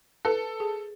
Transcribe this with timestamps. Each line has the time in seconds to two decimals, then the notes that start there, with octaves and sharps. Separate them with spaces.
0.25 A4 B4
0.60 G#4